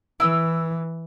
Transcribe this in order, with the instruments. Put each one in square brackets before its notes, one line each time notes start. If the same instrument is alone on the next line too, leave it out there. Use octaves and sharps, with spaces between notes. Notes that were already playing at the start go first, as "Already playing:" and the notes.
[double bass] E3 [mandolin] E4 E6